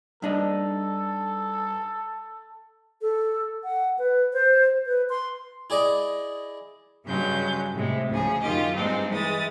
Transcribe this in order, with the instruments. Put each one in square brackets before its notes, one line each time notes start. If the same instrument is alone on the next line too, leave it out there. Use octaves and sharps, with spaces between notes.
[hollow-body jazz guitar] G2 D4 D#4 [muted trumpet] A4
[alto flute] A4
F#5
B4
C5
B4
C6
[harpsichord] E4 G#4 D5 D#5
[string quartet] G2 C#3 F#3 G#3 G6
A2 C3 G#3
D2 C#3 F3 G#4
F#2 D#3 F4 G4 D#5
G2 G#3 C4 D4 D#4
E3 G#3 D#6 A6